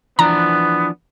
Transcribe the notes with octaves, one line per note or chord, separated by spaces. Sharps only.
E3 F3 B3 D4 A#5